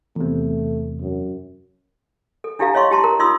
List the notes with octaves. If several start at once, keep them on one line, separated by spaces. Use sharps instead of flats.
E2 C3 A3
F#2
A4
D4 E4 G4 A4 F5 A#5
C#5 D#5 F5 C6 C#6
E4 G4 A5 A#5 C6
A#4 A#5
D#4 F4 C6 D#6 E6